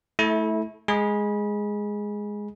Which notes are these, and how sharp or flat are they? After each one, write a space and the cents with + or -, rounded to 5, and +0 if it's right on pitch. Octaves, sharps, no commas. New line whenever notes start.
A3 -10 E4 -20 A4 -40
G#3 +0 G#4 +0 B5 -30